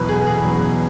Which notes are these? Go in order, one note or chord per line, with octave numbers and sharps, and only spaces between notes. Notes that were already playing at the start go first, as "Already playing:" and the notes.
Already playing: E2 B2 F#3 B4
G#4
G#4
E2 B2 F#3